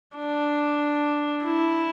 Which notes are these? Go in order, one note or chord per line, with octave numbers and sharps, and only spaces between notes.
D4
E4